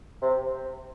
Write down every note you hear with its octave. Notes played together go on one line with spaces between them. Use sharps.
C3